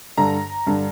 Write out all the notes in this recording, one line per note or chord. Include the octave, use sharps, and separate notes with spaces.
G2 D3 A#5
G2 D3